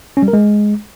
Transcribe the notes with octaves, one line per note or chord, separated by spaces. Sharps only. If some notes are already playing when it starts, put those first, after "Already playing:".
C#4
G3
A#4
G#3